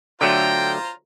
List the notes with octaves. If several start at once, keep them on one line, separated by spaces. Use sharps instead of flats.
D3 F#3 A3 F4 C5 G5 A#5